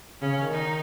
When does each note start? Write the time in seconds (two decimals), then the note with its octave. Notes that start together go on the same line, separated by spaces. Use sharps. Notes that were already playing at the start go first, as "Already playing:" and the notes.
0.21 C#3 C#4
0.32 C#3
0.42 D#3
0.52 D#4